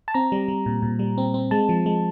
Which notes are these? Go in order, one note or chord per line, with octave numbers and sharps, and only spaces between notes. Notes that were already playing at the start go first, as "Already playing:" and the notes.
A5
C4 A#5
G3
G3
A#2
A#2
G3
C4
C4
G#3 A5
F3
G#3